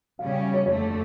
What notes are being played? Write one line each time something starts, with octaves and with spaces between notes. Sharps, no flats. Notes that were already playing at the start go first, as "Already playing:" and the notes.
C#3 G3 C#4 F5
G5
E5
C#5
F2 D3 A3 C#5